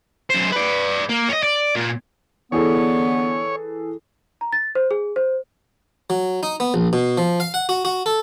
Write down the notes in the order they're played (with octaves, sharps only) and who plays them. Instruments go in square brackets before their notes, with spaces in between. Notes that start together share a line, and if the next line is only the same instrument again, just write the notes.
[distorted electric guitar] F#2 C5
B4 D5
A#3
C#5 D#5
D5
A#2
[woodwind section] D3 B3 [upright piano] E3 G#4 A4 [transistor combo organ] C#5
[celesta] A#5
A6
C5
G#4
C5
[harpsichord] F#3
D#4
B3
A#1
B2
F3
F5
F#5
F#4
F#4
A4